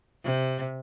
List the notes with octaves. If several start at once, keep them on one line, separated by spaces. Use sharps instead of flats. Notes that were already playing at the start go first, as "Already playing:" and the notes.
C3